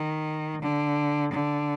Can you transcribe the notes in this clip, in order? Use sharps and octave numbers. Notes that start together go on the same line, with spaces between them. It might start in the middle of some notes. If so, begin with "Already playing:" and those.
Already playing: D#3
D3
D3